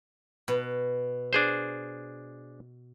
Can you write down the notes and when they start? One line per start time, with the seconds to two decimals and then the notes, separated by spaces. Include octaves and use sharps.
0.48 B2
1.33 D4 G#4 C5